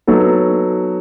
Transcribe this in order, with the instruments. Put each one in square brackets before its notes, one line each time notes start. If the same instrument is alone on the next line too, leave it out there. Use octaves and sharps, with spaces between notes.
[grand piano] F#3 B3 D#4 A4